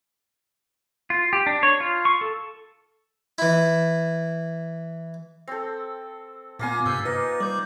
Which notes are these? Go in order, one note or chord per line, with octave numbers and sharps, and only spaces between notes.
F4
G4
D4
C#5
F4
C#6
A4
E3 E4
C4 A4
A#2 A#3 B3 F4 G#5
G2 C3 C5 E6
A#3 D#4 B4
G3 D5 G6